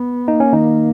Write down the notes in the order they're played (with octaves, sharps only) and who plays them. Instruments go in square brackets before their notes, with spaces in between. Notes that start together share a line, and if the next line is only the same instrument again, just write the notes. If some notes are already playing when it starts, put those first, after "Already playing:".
Already playing: [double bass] B3
[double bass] A#3 [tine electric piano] D#4
[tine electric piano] C#4
D#3 D#4